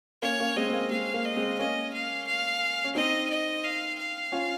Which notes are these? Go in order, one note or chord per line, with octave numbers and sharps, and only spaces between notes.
A#3 C#4 C#5
A#3 C#4
G#3 C4 D#5
C4
A#3
G#3 F5
A#3
D#5
G#3 C4
A#3 C#4 D#5
F5
F5
C#4
C4 D#4 D#5
D#5
F5
F5
C#4 F4